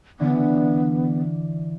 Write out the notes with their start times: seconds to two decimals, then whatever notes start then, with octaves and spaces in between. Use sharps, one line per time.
0.20 D3 E3 B3 D4